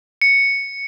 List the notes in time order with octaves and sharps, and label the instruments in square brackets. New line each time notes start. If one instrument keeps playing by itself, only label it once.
[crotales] C#7